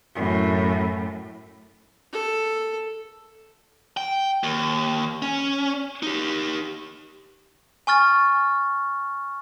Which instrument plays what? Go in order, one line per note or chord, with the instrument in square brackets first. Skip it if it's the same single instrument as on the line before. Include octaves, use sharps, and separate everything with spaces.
[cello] F#2 A2
[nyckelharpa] A4
[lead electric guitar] G5
D#2
C#4
D#4 G4
[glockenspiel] G#5 C#6 F6 A6